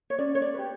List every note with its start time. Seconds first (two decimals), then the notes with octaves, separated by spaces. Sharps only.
0.10 C#5
0.19 C#4 D5
0.35 C#5
0.42 D5
0.54 G4 B4